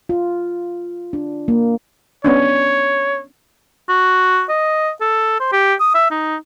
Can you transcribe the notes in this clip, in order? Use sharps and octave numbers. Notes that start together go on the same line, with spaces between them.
F4
D4
A#3
B3 C#4 D4 C#5
F#4
D#5
A4
C5
G4
D#6
E5
D#4